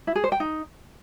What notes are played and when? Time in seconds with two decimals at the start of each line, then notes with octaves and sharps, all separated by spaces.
0.07 E4
0.15 G#4
0.24 C5
0.32 G5
0.40 D#4